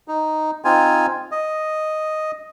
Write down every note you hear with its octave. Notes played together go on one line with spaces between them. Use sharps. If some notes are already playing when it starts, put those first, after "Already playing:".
D#4
C4 D#4 F4 G#5
D#5